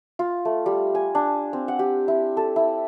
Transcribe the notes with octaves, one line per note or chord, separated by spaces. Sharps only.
F4
A3
G3
G#5
D4
C4
F#5
G4
E4
A4
E4